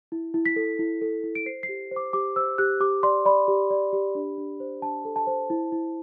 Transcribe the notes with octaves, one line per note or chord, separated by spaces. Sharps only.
E4
E4
B6
A4
E4
A4
E4
D7
C5 C7
C7
G4
C5
D6
G4 D6
C5 E6
G4 F#6
G4 D6
D5 C6
D5 B5
G4
D5
G4
D4
D4
C5
D4 A5
A4
A5
C5
E4
E4